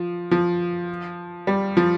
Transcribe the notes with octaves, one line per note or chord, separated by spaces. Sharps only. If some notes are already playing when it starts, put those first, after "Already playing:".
Already playing: F3
F3
G3
F3